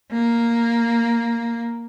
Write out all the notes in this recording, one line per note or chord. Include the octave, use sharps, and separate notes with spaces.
A#3